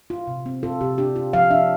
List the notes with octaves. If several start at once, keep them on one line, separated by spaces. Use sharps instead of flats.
F4
C3
C4
F4 A4
C3 G4
D4 G4
F4
F3 F5
D4 E5